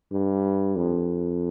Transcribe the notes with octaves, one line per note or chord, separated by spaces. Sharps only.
G2
F2